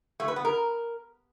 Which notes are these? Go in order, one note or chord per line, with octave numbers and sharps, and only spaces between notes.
A3
B4
B3
A#4